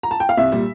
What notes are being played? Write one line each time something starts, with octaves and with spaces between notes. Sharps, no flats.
A#5
A5
G5
F5
C2 E5
A#2 G3